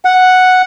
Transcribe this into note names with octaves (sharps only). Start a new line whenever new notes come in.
F#5